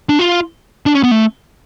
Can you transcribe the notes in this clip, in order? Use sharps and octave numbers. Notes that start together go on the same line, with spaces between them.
D4
F4
D4
C#4
B3
A3